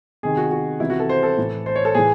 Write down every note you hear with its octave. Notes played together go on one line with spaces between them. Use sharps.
C3 D#3 G#4
F#4
F#4
C3 E3 E4
F#4
A4
C5
A4
A2 E3
C5
C#5
A4
A2 E3 G#4